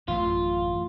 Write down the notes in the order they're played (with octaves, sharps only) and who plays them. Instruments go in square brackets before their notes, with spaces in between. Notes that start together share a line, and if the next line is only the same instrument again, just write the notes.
[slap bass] A1 F#2 A2 [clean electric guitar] F4